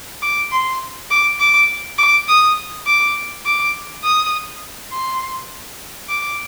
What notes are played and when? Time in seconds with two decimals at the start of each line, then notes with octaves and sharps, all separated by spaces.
0.22 D6
0.52 C6
1.10 D6
1.39 D6
1.98 D6
2.28 D#6
2.87 D6
3.45 D6
4.03 D#6
4.92 C6
6.09 D6